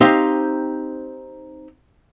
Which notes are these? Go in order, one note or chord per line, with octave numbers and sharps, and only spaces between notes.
C4 D#4 G4 C5 F5